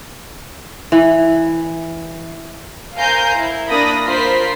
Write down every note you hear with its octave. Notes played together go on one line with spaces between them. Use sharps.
E3
A#4 C5 F5 G#5 A#5 G6
E4
A#3 D4 B5 D#6 A#6
F4 A#4 C5 B5 B6 C7